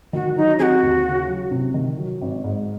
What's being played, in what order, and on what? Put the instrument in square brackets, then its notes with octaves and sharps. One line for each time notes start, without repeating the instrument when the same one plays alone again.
[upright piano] D#3 [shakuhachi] F#4
[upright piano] F#3 [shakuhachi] D#4
[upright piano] C4 [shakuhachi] G#4
[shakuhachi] F#4
[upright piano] D#2
C#3
F#3
C3
D#3
F#3
G#1
G#2